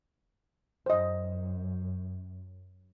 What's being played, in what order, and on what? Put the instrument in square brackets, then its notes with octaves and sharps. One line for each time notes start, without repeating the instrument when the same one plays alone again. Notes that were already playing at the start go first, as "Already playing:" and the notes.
[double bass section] F#2 [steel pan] C5 D#5